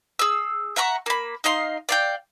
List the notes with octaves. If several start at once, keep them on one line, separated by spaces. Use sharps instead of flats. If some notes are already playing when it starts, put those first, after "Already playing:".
G#4 E6
E5 F#5 A#5 C#6
A#3 B5
D#4 D#5 F5 C6
D5 F5 G5